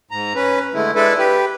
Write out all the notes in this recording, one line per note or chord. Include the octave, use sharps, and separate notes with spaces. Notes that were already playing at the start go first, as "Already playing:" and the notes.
G#2 A#5
C#4 B4
D3 G#3 A3 E4
G#3 D4 E4 A4 B4
G4 B4